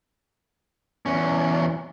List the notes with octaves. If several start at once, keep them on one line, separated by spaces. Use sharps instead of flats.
E2 C#4